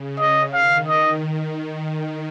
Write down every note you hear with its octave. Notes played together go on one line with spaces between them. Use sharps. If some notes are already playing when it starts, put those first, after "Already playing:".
Already playing: C#3
D#5
D#3 F5
D#5